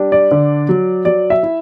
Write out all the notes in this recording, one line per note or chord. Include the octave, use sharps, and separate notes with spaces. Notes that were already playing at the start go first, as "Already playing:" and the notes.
Already playing: G3 D4
D5
D3
F#3
F#3 D5
E5
E4